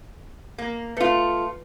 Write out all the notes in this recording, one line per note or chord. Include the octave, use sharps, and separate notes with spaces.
A#3
A3 F4 B4 C#7